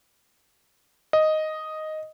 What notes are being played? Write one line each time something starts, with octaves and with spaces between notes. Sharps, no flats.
D#5